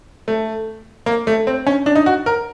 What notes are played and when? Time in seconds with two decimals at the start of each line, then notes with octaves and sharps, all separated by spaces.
0.28 A3
1.06 A#3
1.27 A3
1.47 C4
1.67 C#4
1.86 D4
1.95 D#4
2.06 F#4
2.26 A#4